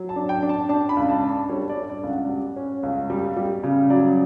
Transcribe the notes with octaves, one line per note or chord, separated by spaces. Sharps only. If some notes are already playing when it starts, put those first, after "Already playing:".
Already playing: F#3
A5
D4
G5
D4
A5
D4 A5
B5
C#2
A5
D4
A5
G3 C#5
D5
D4
D5
C#2
F#5
G3
C#4
C#2
G3
G3
C#3
F#3 D5